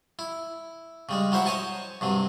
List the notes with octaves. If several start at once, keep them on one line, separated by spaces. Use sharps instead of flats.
E4
C#3 G3 G#3
F#3 E4 C5 E5 F#5
C5 C#5 D#5 G#5 A5
G2 C3 F#3